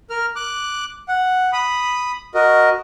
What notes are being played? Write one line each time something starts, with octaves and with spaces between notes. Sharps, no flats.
A#4 F6
D6 F#6
F#5
B5 D#6
F#4 A#4 D#5